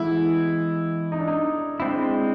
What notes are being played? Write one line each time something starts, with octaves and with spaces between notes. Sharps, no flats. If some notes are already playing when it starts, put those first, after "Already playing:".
Already playing: E3 G#3 B3 E4
D#4
D4
D#4
G#3 C4 D4 E4